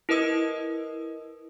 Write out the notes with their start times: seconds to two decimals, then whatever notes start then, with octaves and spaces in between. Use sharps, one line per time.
0.09 E4 A#4 B4 D#5 D#6 E6